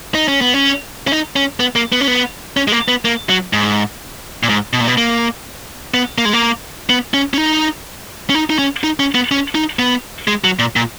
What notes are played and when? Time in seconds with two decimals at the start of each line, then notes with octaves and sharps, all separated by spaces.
0.15 D#4
0.28 C#4
0.41 B3
0.54 C#4
1.07 C#4
1.12 D#4
1.36 C#4
1.60 B3
1.76 A#3
1.92 B3
2.01 C#4
2.07 B3
2.57 C#4
2.68 G#3
2.72 A#3
2.88 B3
3.05 A#3
3.29 F#3
3.53 G#2
4.43 A#2
4.49 G#2
4.73 B2
4.81 A#2
4.88 B2
4.98 A#3
5.94 B3
6.18 A#3
6.25 G#3
6.33 A#3
6.90 B3
7.14 C#4
7.34 C#4
7.38 D#4
8.30 C#4
8.35 D#4
8.50 D#4
8.59 C#4
8.84 D#4
9.00 C#4
9.15 B3
9.31 C#4
9.55 D#4
9.79 B3
10.28 G#3
10.44 F#3
10.59 A#2
10.76 A#2